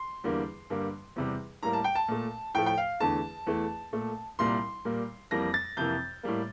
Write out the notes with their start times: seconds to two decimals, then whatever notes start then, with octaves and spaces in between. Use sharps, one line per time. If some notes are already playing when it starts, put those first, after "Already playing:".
Already playing: C6
0.24 E2 D3 G3 A#3
0.70 G2 D3 G3 A#3
1.16 E2 C3 G3
1.63 A2 G3 A#3 A#5
1.73 A5
1.84 G5
1.95 A5
2.08 A#2 A3
2.54 A2 F3 A3 G5
2.66 G5
2.78 F5
3.00 E2 D3 A3 A5
3.47 E2 E3 A3
3.93 A#2 A3
4.39 C2 A#2 G3 A#3 C6
4.85 A#2 G3 A#3
5.31 F2 E3 G3 A#3 A#6
5.54 A6
5.77 F2 C3 E3 A#3 G6
6.23 A2 G3 A#3